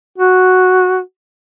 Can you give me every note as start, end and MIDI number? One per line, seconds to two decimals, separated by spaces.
0.18 1.00 66